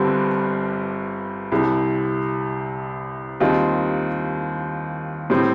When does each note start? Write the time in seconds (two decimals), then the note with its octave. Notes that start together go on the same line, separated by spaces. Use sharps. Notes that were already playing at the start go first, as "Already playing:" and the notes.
Already playing: G1 G2 D3 G3 C4
1.52 C2 C3 G3
3.40 D#2 D#3 G3 C4 F4
5.30 A2 G3 C4